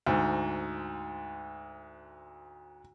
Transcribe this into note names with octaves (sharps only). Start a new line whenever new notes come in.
D2 G#2